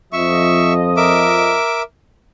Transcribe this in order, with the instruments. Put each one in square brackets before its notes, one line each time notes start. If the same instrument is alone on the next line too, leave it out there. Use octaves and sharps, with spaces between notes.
[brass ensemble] F2 F3 D#5 [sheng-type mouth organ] E5 C#6
[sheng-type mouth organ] A#4 E5 D6